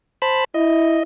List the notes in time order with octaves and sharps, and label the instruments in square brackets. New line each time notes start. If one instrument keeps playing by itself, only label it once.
[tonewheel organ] C5 A5 B5
[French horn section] E4 [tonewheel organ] D#5